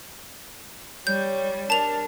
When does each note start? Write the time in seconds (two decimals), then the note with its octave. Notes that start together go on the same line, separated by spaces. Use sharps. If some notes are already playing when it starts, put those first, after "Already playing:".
1.07 G3 C#5 G6
1.70 D4 A#4 A5 F7